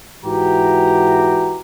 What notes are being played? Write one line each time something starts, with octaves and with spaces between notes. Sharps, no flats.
G#2 E3 F#4 G4 A#5